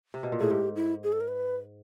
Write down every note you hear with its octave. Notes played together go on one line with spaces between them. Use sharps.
C3
B2
A#2
A2 G#4
G#2 G4
E4
G#4
A4
A#4
B4